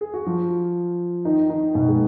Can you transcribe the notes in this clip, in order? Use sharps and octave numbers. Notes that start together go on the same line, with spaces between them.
G#4
F#4
F3 F4
D#3 D#4
D#3 D#4
B2 B3
G#3